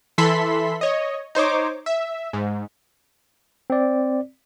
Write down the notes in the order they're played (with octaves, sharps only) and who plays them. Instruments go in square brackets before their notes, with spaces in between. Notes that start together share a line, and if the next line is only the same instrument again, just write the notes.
[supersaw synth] E3 A4 E5 B5 C6 B6
C#5 D#5
D#4 C5 C#5 D6
E5
G#2
[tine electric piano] C4 D5